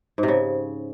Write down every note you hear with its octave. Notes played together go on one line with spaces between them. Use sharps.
G#2
C3
C#3